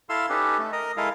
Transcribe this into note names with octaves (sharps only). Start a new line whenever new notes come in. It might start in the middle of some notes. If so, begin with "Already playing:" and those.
E4 A4 F5 C6 E6
C#4 D#4 G4 A4 B4
A3
A#4 D#5 A#5
G#3 E4 A4 A#4 D#5 F5